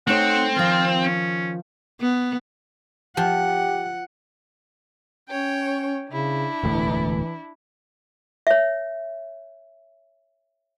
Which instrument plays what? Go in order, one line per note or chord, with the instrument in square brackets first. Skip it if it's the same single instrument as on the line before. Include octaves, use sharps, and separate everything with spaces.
[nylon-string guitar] A3 D#4 C#5 [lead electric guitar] C4 [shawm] F#5
[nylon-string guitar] D#3 F3 [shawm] F4
[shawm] C#4
[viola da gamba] B3
[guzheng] F3 [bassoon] G4 [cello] F#5
[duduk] C#4 [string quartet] C#5 G5
[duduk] C#3 [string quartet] D4 E4
[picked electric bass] E1 D2 A2 [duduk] E3
[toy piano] C#5 E5